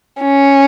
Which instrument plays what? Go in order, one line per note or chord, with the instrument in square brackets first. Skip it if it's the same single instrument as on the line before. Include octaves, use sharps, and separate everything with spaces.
[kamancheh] C#4